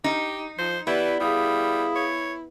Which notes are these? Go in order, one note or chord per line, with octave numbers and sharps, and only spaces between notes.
D#4 G4
F3 C5
E3 B3 E4 G4 D5 B5
G3 E4 G#4 F5 D#6
C#5